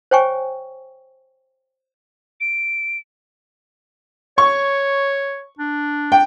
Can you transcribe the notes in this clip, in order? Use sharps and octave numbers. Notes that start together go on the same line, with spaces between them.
C5 C#5 G5 G#5 C#6
D7
C#5 C#6
D4
G5